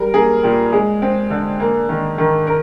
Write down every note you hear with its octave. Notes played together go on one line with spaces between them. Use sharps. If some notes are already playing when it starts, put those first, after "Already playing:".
Already playing: G3 A#4
A#3 G#4
A#2 G4
G#3 G#4
C4
D3
A#3
D#3
D#3
A#4